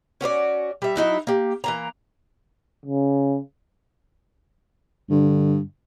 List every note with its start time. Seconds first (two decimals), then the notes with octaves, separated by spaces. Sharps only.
0.21 C#4 F#4 B4 D5
0.82 G3 E5
0.96 F#3 D#4 E4 F#4
1.27 A#3 G4
1.64 E3 A#3 A#5
2.85 C#3
5.10 G2 D3